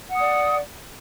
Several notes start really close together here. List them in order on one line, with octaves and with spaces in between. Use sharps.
F#5 D#6 D5